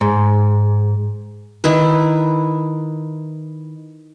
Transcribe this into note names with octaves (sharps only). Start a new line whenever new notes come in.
G#2
D#3 E4 B4